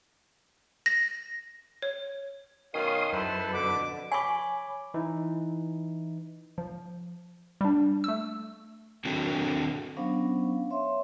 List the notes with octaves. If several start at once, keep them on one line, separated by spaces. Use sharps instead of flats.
A#6
C#5
B2 D#3 F#3 C#4 F5 C6 D#6
F#2 E4 A4 B4 C5
F2 B2 D3 D6
C#5 G#5 B5 C#6 D6
E3 D#4 E4
F3
G3 D4
A3 E6
D#3 C4 D4 F#4 A4
F#3 B3 C#4 D4 C5 F5
C#5 E5 C6